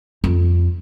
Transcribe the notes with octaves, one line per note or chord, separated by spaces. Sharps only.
F2